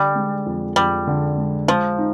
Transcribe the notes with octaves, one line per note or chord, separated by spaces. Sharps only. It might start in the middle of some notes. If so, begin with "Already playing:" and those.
Already playing: D3 G3
G#3
F2
F2 G3
D3
G#3
F3 G#3
D#4